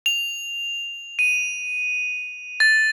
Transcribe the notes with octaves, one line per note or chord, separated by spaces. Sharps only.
F7
D#7
A6